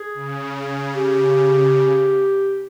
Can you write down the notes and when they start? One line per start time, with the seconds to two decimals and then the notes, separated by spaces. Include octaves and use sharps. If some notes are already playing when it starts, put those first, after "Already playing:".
Already playing: G#4
0.14 C#3
0.95 G4